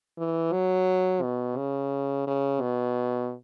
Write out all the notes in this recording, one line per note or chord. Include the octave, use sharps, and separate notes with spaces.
E3
F#3
B2
C#3
C#3
B2